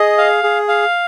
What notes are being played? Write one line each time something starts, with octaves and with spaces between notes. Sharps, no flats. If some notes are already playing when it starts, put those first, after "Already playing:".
Already playing: G#4 D#5
F5
G#4
F5